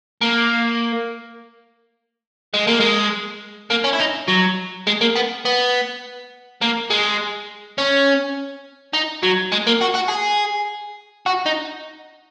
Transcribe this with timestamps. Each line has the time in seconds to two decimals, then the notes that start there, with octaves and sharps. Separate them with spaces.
0.21 A#3
2.54 G#3
2.67 A#3
2.80 G#3
3.71 A#3
3.85 C#4
3.93 E4
4.00 D#4
4.28 F#3
4.87 G#3
5.01 A#3
5.15 B3
5.45 B3
6.61 A#3
6.90 G#3
7.78 C#4
8.93 D#4
9.23 F#3
9.52 G#3
9.67 A#3
9.82 F#4
9.95 F#4
10.09 G#4
11.26 F#4
11.46 D#4